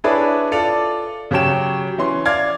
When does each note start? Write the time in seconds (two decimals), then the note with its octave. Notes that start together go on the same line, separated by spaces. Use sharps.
0.04 D4 E4 G#4 B4 C#5 D5
0.51 F4 A4 D5 F7
1.31 C#3 F#3 G4 C#5 G5 E7
1.98 E3 C#4 C6
2.25 D5 F5 F6 G#6